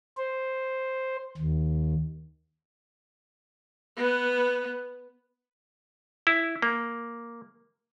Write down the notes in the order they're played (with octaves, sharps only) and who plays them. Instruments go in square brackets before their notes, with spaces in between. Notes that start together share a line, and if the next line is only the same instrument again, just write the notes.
[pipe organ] C5
D#2
[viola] B3 B4
[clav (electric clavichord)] E4
A#3